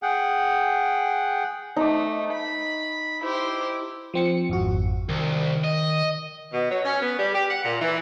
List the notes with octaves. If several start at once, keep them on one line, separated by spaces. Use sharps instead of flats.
G#4 F#5 G5
A3 D#4 D6
B5
E4 G4 C5
F3 C4 C#7
G#1 F2 F#4
C2 D#3
D#5
B2
F#3
C#4
B3
G3
G4
F#5
A#2
E3